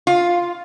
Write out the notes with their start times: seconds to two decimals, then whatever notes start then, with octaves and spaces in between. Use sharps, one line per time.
0.07 F4